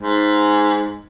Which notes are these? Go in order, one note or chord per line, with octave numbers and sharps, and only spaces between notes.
G#2